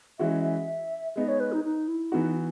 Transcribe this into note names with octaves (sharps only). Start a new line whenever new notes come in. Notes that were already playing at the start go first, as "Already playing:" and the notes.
E3 G#3 C#4 F#4 E5
E5
G#3 B3 D#4 D#5
C#5
B4
D#4
D#4
E4
E3 B3 D#4 F#4